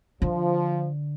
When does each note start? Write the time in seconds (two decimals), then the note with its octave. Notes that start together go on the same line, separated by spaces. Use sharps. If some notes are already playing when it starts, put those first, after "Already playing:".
0.22 D3 F3